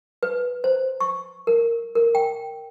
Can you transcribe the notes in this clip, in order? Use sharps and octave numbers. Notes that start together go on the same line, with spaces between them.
B4
C5
C#6
A#4
A#4
G5